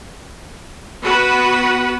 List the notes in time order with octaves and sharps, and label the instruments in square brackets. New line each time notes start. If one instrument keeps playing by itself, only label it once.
[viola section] B3 F#4 B4 F#5